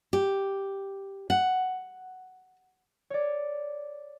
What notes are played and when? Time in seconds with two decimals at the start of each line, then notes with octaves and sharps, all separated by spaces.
0.13 G4
1.30 F#5
3.10 C#5 D5